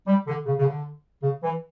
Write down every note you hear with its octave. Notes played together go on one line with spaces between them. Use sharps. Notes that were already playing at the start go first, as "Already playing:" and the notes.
G3
D3
C#3
C#3
D3
C#3
E3